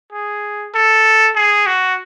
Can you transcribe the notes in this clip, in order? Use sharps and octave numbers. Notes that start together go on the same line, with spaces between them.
G#4
A4
G#4
F#4